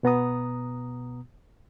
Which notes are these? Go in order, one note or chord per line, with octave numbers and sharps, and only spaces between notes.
B2 B3 A#5 D#6